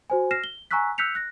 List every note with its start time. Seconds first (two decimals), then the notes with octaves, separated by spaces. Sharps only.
0.10 F#4 C5 G#5
0.31 F6 A#6 C7 E7
0.44 G7
0.71 G#5 A#5 C#6 E6 F#6 B6
0.98 E6 F#6 G6 B6 C#7 F7
1.15 F#6 A#6